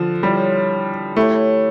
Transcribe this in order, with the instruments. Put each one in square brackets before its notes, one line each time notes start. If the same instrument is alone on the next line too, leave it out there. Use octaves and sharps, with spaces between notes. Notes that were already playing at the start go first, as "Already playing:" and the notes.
Already playing: [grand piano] D3 F3
[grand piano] G3 [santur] E4 G4 C#5
[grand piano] A3 [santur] E4 G4 C#5